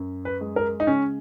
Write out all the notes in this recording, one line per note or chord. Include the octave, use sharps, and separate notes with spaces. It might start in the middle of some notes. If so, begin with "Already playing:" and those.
Already playing: F#2
B4
G#3
A#4
D#4
C#3 C#4